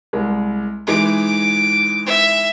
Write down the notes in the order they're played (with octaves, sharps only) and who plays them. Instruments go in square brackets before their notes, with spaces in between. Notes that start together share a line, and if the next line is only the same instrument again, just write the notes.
[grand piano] C2 G#3
[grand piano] E3 G#3 D#4 [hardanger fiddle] D6
[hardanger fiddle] E5